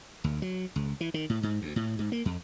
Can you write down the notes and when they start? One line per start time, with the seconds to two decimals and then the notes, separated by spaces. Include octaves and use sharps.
0.24 D2
0.42 F#3
0.76 C#2
1.01 E3
1.14 D#3
1.30 A2
1.43 G#2
1.62 D2
1.76 A2
1.99 G#2
2.12 A#3
2.25 F2